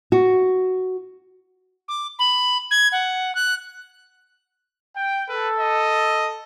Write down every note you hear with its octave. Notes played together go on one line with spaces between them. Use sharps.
F#4
D6
B5
G#6
F#5
F#6
G5
A4 B4
D#5